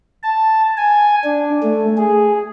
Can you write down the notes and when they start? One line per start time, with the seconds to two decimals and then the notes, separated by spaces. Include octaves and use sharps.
0.23 A5
0.77 G#5
1.24 D4
1.63 A3
1.98 G#4